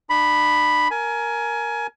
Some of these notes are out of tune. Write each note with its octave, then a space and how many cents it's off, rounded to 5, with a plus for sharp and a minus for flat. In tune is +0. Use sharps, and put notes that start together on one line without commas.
D4 +45 B5 +0
A#4 +0 G#5 +20